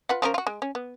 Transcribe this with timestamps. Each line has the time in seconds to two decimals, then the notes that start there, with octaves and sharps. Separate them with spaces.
0.09 F4 B4 F#5
0.22 F3 C#4 A#4
0.34 F4 F#4
0.47 G#3
0.62 C#4
0.75 B3